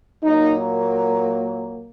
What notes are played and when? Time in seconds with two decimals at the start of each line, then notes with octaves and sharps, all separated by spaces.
0.23 A#2 F#3 A#3 D#4